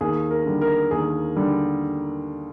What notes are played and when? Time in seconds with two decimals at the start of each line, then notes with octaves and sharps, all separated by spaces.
0.01 D#2 G#4
0.31 A#4
0.46 D3 G3
0.61 A#4
0.91 D#2 G#4
1.37 D3 G3